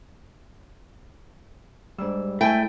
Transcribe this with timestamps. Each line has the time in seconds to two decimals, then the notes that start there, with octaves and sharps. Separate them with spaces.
1.98 G#2 G3 D4 E6
2.41 A3 E4 G5 G#5